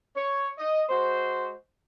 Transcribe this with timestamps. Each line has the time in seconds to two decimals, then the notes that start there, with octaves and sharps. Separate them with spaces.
0.15 C#5
0.58 D#5
0.89 G#3 F#4 C5